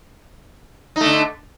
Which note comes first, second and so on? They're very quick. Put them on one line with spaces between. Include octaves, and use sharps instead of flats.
D#4 A3 D3